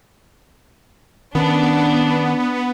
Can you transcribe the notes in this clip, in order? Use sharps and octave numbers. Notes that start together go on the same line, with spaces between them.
D#3 B3 C#4 D4